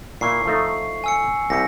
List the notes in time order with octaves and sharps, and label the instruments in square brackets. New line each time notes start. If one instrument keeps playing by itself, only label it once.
[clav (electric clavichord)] A#2 E4 [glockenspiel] C#6 C7
[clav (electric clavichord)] F3 A3 D#4
[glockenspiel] G#5 E6 C#7
[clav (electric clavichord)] C2 G4 E5 [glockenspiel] A#6 C#7